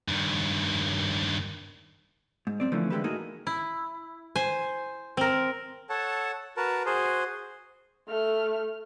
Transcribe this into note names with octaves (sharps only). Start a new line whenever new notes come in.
G2 D#3
G#2
F#2 C4 D5
D3 E3 F3 A3 A#3 C#4
D3 E3 G#3 G4 A4 B4
A2 A#3 D#4 F#4 G#4 A4
E4
C5 G#5
C4 A#4
A4 C#5 F#5 A5
F#4 A#4 B4 A5
F#4 G#4 C5
A3 F6